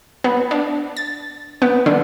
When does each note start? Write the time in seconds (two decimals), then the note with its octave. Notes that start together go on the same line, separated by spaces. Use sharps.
0.24 B3
0.51 D4
0.97 A6
1.62 B3
1.86 D3